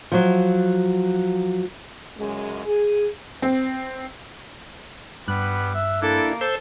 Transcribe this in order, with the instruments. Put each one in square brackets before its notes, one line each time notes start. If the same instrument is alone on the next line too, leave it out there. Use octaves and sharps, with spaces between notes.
[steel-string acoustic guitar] F3 F#3
[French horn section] F#2 C#3 G#3
G#4
[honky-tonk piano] C4
[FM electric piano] G2 F#6 [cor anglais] G3 [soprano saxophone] B3
[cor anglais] E5
[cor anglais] A#3 [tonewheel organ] D4 E4 [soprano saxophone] A4
[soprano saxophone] A4 [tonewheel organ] C5 E6 G6